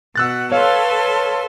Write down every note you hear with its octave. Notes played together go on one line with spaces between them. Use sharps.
B2 F#5 E6 F#6 A6
A4 B4 C#5 F5 C6